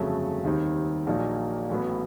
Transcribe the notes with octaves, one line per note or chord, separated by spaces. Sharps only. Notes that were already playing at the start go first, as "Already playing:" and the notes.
Already playing: G1 F2 C#3 F#3 A3
D#2 D#3 G3 C4 D#4
A#1 A#2 F#3 A#3 D#4
A1 A2 F#3 B3